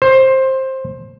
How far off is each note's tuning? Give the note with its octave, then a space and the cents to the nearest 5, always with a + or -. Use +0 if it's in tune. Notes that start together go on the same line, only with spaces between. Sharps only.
C5 +15